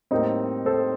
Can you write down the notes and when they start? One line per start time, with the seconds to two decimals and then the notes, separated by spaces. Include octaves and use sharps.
0.11 A2 G3 A#3 C4 D#4
0.66 A4 C5